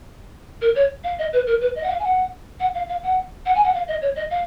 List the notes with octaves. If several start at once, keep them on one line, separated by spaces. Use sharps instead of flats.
A#4
C#5
F5
D#5
B4
A#4
B4
D#5
F#5
F5
G#5
F#5
F#5
F5
F5
F#5
F#5
G#5
F#5
F5
D#5
C#5
D#5
F5